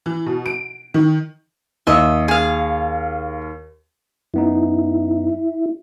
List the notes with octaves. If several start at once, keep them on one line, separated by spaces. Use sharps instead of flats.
E3
B2
D7
D#3
D#2 D#5 E5
G#4 F5
F#2 B3 D#4 E4